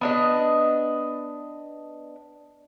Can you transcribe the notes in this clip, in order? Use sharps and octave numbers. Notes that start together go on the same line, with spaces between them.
B3 D4 D#5